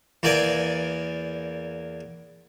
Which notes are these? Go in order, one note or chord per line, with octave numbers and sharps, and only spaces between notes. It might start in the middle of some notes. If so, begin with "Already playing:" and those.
E2 A#3 D5 G#5